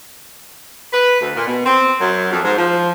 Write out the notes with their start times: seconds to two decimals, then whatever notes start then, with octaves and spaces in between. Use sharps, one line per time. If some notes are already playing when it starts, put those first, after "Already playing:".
0.92 B4
1.20 D2
1.35 A#2
1.47 B2
1.65 C4
2.00 F#2
2.32 F2
2.43 G#2
2.57 F3